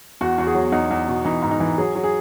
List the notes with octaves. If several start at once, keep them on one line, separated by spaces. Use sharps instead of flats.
E2 F#4
E2 F#4
G#4
F#3
E2 D#4
E2
B2
E3 D#4
G#2
D#4
E3
F#3 G#4
F#3
G#4